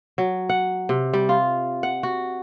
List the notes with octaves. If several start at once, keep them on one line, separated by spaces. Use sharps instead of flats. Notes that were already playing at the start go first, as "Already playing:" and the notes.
F#3
F#5
C3
G3
F4
F#5
F#4